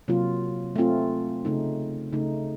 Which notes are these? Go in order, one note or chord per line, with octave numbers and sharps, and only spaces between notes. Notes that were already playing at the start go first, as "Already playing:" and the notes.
C3 F#3 A#3 F4
A3 C4 F4
C#3 A3 D#4
C#3 A3 D#4